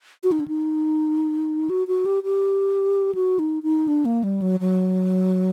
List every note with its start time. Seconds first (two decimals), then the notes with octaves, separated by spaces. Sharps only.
0.24 F#4
0.32 D#4
0.40 D4
0.48 D#4
1.70 F#4
1.88 F#4
2.06 G4
2.24 G4
3.15 F#4
3.39 D#4
3.63 D#4
3.88 D4
4.05 A#3
4.24 G3
4.42 F#3
4.60 F#3